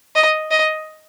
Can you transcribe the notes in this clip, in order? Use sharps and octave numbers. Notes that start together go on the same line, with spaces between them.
D#5
D#5